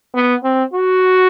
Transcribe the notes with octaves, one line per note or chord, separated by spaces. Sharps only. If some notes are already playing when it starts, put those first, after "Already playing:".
B3
C4
F#4